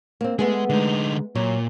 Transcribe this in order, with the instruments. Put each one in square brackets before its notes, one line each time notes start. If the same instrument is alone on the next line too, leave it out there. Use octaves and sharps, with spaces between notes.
[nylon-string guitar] A#3 C4
[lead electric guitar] G#3 [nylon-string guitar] A3 B3 G#4
[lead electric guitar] D3 D#4 [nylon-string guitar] G#3
[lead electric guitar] A#2 [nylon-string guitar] F#3